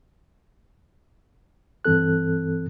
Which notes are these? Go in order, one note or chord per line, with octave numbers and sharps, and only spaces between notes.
G2 E3 C4 A4 F#6